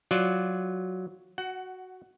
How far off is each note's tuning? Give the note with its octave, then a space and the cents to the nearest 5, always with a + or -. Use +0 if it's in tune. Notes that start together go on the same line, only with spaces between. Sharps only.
F#3 +0 F4 +0 D5 +0
F#4 +0 F#5 +20